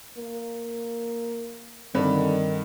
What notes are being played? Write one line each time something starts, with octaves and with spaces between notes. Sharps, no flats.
A#3
G2 D3 D#3 C4 B5